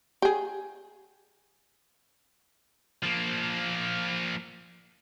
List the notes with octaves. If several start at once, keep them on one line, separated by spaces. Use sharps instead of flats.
G4 G#4
F3 A#3